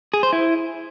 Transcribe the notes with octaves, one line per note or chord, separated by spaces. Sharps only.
G#4
C5
E4